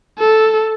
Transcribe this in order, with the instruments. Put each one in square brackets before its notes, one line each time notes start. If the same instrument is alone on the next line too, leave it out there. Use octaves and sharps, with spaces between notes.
[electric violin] A4